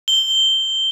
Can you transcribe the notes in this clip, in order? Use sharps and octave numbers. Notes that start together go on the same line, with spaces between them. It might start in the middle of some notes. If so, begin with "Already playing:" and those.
G7